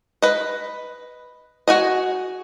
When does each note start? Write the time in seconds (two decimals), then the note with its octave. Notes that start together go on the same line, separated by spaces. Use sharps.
0.22 B4 D#5
1.68 F#4 G#4 D#5